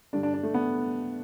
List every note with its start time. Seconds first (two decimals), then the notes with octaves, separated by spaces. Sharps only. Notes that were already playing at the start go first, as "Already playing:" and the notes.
0.13 G2 D3 D4
0.23 D4
0.34 D4
0.43 A3
0.54 B3